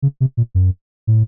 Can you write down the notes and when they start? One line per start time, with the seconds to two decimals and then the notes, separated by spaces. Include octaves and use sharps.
0.02 C#3
0.20 C3
0.37 A#2
0.55 F#2
1.07 A2